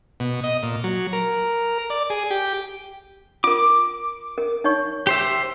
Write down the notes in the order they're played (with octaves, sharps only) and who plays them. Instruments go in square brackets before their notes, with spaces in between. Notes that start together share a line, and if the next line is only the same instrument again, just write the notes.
[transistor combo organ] B2
D#5
A#2
F#3
A#4
D5
G#4
G4
[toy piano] F4 A#4 [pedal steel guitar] D6
[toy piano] A#4
D#4 C#5 C#6
[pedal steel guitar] G4 C5 E5